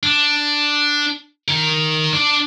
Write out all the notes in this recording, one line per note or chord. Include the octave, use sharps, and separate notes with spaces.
D4
D#3 A#4
D4 D5